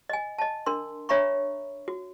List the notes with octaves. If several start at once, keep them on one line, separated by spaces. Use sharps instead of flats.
D#5 G#5
D#5 A5
D4 A#4 C6
D4 C#5 E5 A#5 B5 C#6
F#4